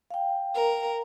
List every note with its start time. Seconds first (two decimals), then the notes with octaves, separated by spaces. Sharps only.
0.11 F5 G5
0.54 A#4